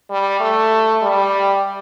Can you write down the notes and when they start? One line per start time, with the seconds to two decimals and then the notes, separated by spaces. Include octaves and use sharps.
0.11 G3
0.40 A3
1.02 G3